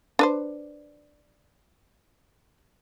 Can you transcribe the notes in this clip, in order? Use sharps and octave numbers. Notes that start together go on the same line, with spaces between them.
D4 B4 C5